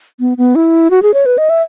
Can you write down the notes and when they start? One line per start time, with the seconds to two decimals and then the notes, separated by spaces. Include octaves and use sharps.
0.20 B3
0.38 B3
0.55 E4
0.91 F#4
1.03 G#4
1.14 C#5
1.26 B4
1.38 D#5
1.50 E5